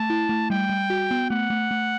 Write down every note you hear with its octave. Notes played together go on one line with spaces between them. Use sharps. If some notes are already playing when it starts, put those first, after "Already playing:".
Already playing: A3 A5
E4
A3
G3 G5
G3
F#4
B3
A3 F#5
A3
A3